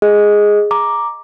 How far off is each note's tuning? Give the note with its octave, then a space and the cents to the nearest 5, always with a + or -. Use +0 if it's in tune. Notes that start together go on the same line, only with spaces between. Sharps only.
G#4 +0 D#5 +0
A#5 +0 D6 +0